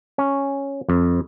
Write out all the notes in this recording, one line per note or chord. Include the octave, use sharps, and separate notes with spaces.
C#4
F2